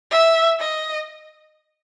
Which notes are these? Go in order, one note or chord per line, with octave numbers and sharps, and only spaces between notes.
E5
D#5